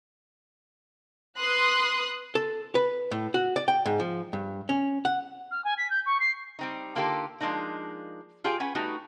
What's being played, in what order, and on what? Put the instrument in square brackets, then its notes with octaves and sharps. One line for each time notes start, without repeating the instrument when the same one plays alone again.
[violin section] B4 C6 D#6 F#6
[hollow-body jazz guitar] A4
B4
A2
F#4
D5
G5
G#2
F3
G2
C#4
F#5
[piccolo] F6
G#5
B6
G6
C#6
C7
[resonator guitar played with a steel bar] G3 C4 D#4
D3 A#3 D#4 F4 G4 A4
F3 G#3 A#3 D4 D#4
F4 G4 G#4 D5 G#5
C#4 B4 F#5 G#5
G3 A3 B3 D#4 F#4